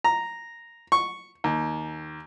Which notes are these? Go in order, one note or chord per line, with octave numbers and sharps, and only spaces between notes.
A#5
C#6
D#2